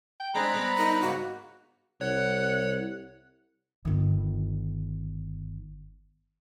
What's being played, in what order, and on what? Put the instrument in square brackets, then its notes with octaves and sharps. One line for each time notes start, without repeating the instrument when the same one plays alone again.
[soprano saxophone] G5
[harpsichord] G#3 C4 D4 [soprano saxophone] G#4 [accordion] A#5 B5 F#6
[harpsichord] G3 B3 C4
[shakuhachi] D#4 [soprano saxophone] A#4
[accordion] G#2 C#3 A#3 [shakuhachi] F#4
[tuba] C2 [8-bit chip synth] C#5 [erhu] F#5
[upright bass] G1 D#3